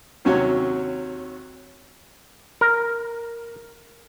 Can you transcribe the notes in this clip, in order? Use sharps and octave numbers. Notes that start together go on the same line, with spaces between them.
D#2 C3 F#3 C#4 F#4 C#5
A#4